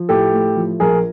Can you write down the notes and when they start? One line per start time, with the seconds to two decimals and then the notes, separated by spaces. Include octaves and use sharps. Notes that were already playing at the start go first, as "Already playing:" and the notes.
Already playing: F3
0.09 A2 G4 A4
0.33 A3
0.56 F3
0.80 A#1 G#4 A#4